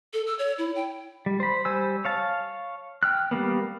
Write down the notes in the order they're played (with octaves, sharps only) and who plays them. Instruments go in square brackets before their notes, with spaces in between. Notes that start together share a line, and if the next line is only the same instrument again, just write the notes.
[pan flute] A4
E6
C#5
E4
G5
[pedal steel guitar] G3
C5 B5
G3 C5 G#5 E6
C#5 F5 A5
G5 F6 F#6
G3 G#3 A#3 B3